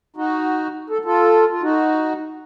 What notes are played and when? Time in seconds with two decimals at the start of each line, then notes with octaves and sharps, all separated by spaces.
0.16 D#4 F#4
0.90 A4
1.05 F4 A4
1.51 F4
1.62 D#4 F#4